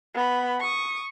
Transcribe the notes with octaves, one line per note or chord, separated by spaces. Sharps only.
B3 B5
C#6 D#6